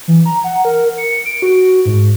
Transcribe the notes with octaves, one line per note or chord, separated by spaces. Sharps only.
E3
A#5
F#5
A#4
C#7
D7
F#4
G#2